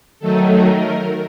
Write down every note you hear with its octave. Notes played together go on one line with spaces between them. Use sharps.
D#3 F#3 A3 D#4 A4
A#4
A#4